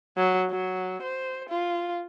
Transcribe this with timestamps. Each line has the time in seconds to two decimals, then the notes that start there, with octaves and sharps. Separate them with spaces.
0.17 F#3
0.50 F#3
1.03 C5
1.50 F4